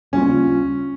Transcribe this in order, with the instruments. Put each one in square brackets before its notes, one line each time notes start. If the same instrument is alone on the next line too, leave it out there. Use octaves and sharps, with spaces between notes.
[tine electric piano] D#2 C#3 G3 A#3 F4 [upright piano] C#4